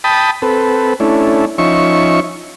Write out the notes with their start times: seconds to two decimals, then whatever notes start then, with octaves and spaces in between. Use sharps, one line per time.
0.04 G5 A5 B5 D#6
0.42 C4 A4 B4
1.00 A3 C#4 D4 E4
1.58 F3 C#4 D#4 E5 C#6